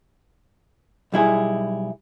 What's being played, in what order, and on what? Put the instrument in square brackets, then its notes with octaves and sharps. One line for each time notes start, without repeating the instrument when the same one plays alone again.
[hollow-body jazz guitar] B1 G3 E4 G#4